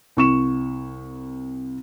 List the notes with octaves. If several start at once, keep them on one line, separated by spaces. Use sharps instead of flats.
C2 C#6 E7